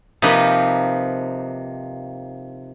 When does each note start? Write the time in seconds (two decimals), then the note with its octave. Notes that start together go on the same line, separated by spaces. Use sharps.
0.22 C3 F3 A#3 D#4 B4 B5